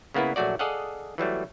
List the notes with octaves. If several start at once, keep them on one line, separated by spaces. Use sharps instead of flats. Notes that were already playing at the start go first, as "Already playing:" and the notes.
C#3 A#3 B3 E4 B4
A#1 F#3 A3 F#4 D5
G#4 A4 D5 D#5 F5 F#5
E3 F#3 G3 A3